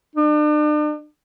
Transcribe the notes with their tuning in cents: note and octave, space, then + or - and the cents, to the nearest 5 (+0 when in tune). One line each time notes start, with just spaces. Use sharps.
D4 +40